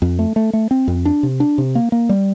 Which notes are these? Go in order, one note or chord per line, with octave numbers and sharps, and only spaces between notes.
F2
A3
A3
A3
C4
F2
D4
C3
D4
C3
A#3
A#3
G3